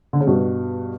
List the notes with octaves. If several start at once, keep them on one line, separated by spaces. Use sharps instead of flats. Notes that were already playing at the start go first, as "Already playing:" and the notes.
D3
C#3
G2 B2